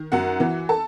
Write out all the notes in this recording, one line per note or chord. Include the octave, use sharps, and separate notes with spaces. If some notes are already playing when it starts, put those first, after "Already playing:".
Already playing: D#3
F#2 F#4 F#5
E3
A4 A5